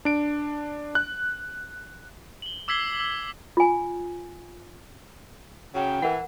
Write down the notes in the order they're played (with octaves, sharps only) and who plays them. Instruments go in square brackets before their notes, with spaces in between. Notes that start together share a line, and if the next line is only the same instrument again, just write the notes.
[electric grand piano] D4 D7
F#6
[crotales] F#7 G7
D6 E6 G#6 B6 C7 G7
E6
[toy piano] F4 G#5
[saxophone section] C#3 F#3 [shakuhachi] G5
[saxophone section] E3 [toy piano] A#4 F#5